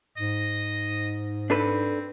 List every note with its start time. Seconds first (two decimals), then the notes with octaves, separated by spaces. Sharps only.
0.17 G#2 D#5
1.50 C4 D4 A4 B4